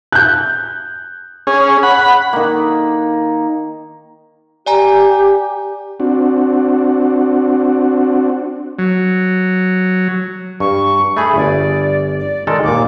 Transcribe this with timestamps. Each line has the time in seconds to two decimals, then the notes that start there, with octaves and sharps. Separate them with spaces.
0.12 F#6 G6
1.47 C#4 G#4
1.83 F#5 B5
2.33 D#3 A#3
4.66 G4 D5 G#5 A#5
6.00 C4 D4 F#4
8.79 F#3
10.60 G2 C#6
11.17 A3 G#4 B5
11.36 G1 D5
12.19 D5
12.47 D#3 G#3 A4 D5
12.64 D#2 A#2 D6